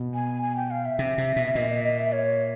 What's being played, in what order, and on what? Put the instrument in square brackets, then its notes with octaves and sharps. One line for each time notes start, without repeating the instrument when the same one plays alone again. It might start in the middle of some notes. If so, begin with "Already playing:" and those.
Already playing: [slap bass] B2
[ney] G#5
G#5
G5
F5
E5
[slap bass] C3
C3
B2
[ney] E5
[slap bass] A#2 [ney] D#5
[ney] D#5
D#5
E5
C#5